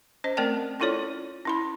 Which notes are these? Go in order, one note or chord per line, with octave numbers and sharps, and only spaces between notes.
C#4 C5 D#5
A3 C4 A#4 D5 G5 A5
C#4 E4 F4 A4 C#5 D5
C#4 E4 B5